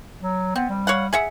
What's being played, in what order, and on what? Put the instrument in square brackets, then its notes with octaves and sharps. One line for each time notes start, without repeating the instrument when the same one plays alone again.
[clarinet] F#3
[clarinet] B3 [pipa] C4
[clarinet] G3
[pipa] C#5 F5 F#5
G#4 E5 F#5